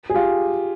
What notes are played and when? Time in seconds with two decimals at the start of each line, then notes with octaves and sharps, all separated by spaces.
0.10 G#4
0.14 F4 G4